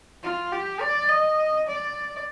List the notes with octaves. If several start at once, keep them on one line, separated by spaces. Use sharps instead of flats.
F4
G4
D5
D#5
D5